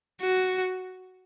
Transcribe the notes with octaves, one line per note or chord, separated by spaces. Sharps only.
F#4